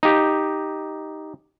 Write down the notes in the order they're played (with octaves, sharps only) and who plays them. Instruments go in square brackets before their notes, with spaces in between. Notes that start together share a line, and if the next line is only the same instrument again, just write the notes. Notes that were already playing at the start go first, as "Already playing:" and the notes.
[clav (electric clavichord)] D#4 G4